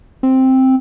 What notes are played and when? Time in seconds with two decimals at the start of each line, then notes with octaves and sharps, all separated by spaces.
0.23 C4